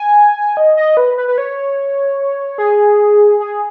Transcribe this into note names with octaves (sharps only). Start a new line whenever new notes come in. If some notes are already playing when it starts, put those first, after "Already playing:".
Already playing: G#5
D#5
D#5
B4
B4
B4
C#5
G#4
G#4